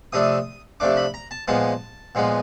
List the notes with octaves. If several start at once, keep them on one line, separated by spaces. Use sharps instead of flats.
C3 F3 A3 D4 D#6
C3 F3 A3 D4 D6
B5
A#5
A5
A#2 F3 G#3 B3 A5
A#2 F3 G#3 B3